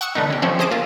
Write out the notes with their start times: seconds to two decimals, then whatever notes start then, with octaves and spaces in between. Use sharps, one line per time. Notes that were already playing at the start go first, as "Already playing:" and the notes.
0.01 F#5 C#6 D#6 E6 C#7
0.15 D3 A3 B3 D#4
0.30 C#4 G4
0.42 F3 C4 C#4 E4
0.59 G#4 C5 D#5 A5 D6
0.71 A#3 F4 E5